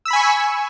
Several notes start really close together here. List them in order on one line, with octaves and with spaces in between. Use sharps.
E6 B6 B5 G#5 C#6